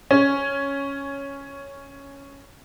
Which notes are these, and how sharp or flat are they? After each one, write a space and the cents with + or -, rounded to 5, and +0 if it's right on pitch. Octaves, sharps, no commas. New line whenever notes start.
C#4 +5